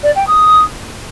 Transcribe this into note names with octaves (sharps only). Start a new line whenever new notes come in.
D5
G5
D#6